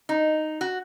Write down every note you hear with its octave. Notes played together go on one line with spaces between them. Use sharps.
D#4
F#4